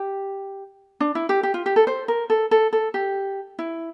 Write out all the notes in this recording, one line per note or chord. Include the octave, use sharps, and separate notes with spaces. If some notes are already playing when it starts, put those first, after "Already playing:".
Already playing: G4
D4
E4
G4
G4
F4
G4
A4
C5
A#4
A4
A4
A4
G4
E4